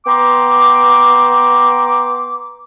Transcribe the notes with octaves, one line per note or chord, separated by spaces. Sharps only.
B3 G5 A#5 C6 D6